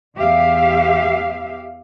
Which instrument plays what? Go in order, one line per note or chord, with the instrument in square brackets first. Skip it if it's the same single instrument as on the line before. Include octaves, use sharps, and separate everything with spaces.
[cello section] E2 G4 E5 F5